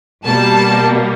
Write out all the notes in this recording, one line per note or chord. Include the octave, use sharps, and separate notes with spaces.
B2 G3 A#3 A5